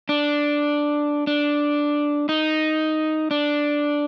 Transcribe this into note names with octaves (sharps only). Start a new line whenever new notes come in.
D4
D4
D#4
D4